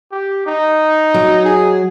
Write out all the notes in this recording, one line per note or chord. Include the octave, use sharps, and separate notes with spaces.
G4
D#4
F#3
G#4